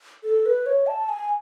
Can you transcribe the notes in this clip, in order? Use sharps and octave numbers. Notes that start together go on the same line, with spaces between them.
A4
B4
C#5
A5
G#5